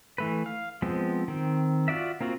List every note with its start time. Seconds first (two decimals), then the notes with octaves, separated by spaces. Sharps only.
0.18 E3 A3 B4
0.46 F5
0.82 F3 G#3 B3 C4
1.28 D#3 C4
1.88 F4 F#4 D5 E5
2.21 A#3 C4 F4 F#4